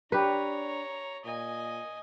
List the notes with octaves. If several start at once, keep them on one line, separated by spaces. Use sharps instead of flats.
D4 G4 B4 C#5 A#5
A#2 D#5 G#5